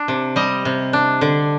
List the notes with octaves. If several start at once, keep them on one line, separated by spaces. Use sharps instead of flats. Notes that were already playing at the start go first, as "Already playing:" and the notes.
Already playing: D4
C3
G3 D#5
C3
D4
D3